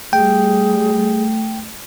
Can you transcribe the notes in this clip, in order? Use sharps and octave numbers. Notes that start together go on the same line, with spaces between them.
G3 A3 G#4 G5